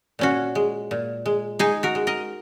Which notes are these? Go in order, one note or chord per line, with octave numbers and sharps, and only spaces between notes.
A#2 C#4 F#4
G#3
A#2
G#3
G#3 D#4 G#4
F#4 A#4
G#3
A#4 D#5